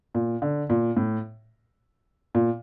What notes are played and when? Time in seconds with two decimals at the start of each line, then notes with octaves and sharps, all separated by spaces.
0.15 A#2
0.42 D3
0.70 A#2
0.97 A2
2.35 A#2